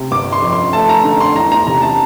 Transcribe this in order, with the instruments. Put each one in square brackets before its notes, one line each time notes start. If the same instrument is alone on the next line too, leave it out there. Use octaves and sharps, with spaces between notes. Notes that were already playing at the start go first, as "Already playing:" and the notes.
Already playing: [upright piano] C3
G1 D6
C6
F2
C6
A3 A5
A#5
D3
C6
E2 A#5
A#5
C3 A#5
A5